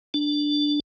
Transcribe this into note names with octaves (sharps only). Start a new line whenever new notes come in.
D4